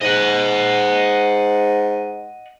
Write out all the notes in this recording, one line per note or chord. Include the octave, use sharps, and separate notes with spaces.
G#2 D#5 F#5